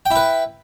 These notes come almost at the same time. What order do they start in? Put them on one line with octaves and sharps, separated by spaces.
G5 E4 B4